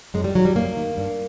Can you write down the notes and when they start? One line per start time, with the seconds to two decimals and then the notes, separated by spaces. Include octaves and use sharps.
0.14 F#2 G#3
0.24 G3
0.35 D#3 F#3
0.45 G3
0.56 F#2 A#3
0.76 D#3
0.97 G2